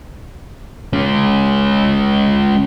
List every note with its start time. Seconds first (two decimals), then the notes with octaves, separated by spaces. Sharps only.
0.93 G#3 C#4